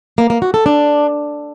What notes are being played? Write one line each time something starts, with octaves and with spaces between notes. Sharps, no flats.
A#3
A#3
F#4
A4
D4